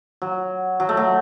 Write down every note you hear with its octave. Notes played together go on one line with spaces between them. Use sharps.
F#3
F#3
A3
F#3